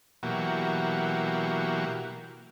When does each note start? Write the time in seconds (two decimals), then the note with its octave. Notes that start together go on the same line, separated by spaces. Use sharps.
0.23 B2 E3 F#3 A#3 F#4 G4